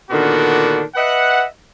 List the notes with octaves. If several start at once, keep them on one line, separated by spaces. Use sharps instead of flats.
A#2 D3 D#3 B3 D4 F#4
B4 D#5 E5 F#5